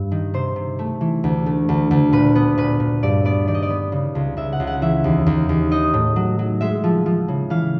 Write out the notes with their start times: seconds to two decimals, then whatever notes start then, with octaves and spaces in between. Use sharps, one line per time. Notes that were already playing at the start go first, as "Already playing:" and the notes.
Already playing: G2
0.11 D#3
0.34 C3 C5
0.56 C3
0.79 A3
1.01 E3
1.24 D2
1.46 A3
1.69 D2
1.91 D2
2.13 A#2 B4
2.35 B3
2.58 A#2 B4
2.80 A#2
3.03 G2 D5
3.25 B3 D5
3.47 D#3 D5
3.55 D#5
3.62 D5
3.70 B3
3.92 C#3
4.15 C#2
4.37 C#2 E5
4.53 F#5
4.60 C#2
4.67 F#5
4.82 E3 E5
5.04 D#2
5.26 D#2
5.49 D#2
5.71 D#4 D#5
5.94 A2
6.16 F#3
6.39 F#3
6.61 G#3 E5
6.84 F3
7.06 F3
7.28 C#3
7.50 E3 F5